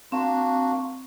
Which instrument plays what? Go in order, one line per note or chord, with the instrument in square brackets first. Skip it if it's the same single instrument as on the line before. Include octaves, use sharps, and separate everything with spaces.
[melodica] A#3 D4 F#4 [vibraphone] C4